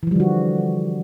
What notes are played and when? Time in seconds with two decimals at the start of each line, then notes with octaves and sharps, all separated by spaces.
0.03 E3
0.07 F3
0.11 G3
0.16 D3
0.20 F#4